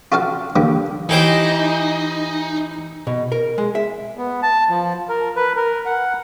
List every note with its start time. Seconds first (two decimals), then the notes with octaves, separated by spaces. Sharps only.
0.12 F4 F#4 A4 F5 F#5
0.56 D3 G3 A#3
1.09 E3 D#4 G4 C5
3.07 B2
3.32 A#4
3.58 G#3
3.75 E5
4.18 B3
4.43 A5
4.69 F3
5.09 A#4
5.36 B4
5.56 A#4
5.85 F#5